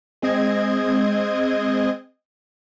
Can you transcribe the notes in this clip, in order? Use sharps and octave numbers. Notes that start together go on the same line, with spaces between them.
G#3 C4 D#5 G#6